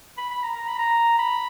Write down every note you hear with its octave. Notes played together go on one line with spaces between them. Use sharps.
B5
B5
A#5
A#5
B5
A#5
B5